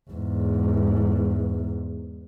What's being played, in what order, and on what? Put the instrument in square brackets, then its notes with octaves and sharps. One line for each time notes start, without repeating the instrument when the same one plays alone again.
[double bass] E2 G#2